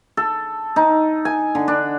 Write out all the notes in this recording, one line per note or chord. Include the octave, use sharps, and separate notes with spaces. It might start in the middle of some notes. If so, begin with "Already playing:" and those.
A4
D#4
G#5
D3
D4